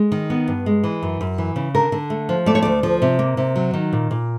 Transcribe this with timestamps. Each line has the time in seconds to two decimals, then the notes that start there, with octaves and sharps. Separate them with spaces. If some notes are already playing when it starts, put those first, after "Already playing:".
Already playing: G#3
0.12 D#3
0.30 B3
0.48 G2
0.66 G#3
0.84 E3
1.03 F#2
1.21 F#2
1.38 E3
1.56 C#3
1.75 D3 A#4
1.92 D3
2.10 A3
2.29 F3
2.46 A3 D5
2.55 C#5
2.62 D2 D5
2.83 F3
3.02 C3
3.19 A#3
3.37 C3
3.56 F#3
3.74 D#3
3.92 A#2
4.11 A#2